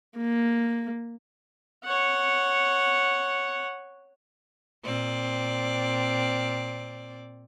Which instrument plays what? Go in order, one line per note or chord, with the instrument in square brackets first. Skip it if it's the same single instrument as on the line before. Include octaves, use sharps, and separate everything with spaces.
[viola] A#3
[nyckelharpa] C#5 F#5
[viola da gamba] A#2 C4 D5